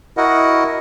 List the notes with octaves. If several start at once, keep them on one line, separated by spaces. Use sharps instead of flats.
E4 F#4 A#4 D#5 F#5